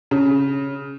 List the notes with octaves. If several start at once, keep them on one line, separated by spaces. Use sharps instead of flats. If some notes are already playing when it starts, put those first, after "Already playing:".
C#3